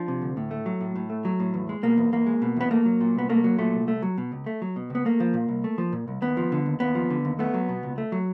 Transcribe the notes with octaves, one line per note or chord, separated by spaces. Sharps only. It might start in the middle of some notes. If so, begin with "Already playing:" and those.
Already playing: F3 D4
C3
D2
A2
A3
F#3
A2
A2
A3
F#3
A2
E2
G#3
B2 A#3
E2
E2 A#3
G#3
B2
E2 B3
A3 A#3
F#3
A#2
C2 B3
A3 A#3
F#3
A#2 A3
C2
A3
F#3
B2
C#2
A3
F#3
B2
C#2 B3
A3 A#3
F3
A#2
C2
A3
F3
A#2
C2
D#2 B3
F3
D3
D#2
D#2 B3
F3
D3
D#2
A3 B3
F#3
B2
C#2
A3
F#3